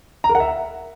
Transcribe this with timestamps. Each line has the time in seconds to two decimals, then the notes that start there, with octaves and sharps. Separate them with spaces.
0.24 A#5
0.29 A#4
0.35 F#5
0.40 E5